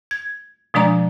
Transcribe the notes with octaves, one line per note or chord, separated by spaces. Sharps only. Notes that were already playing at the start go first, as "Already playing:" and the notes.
G#6
B2 F3 G#3 D4 D5 A#5